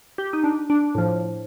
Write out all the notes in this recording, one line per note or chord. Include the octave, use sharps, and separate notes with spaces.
G4
D#4
D4
D4
A2 F3